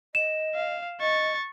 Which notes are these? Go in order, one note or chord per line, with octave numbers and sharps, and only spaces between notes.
D#5 E7
F5
D#5 C#6 A6